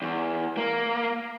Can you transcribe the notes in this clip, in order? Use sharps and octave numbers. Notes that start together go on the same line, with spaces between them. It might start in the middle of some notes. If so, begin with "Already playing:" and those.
E2
A#3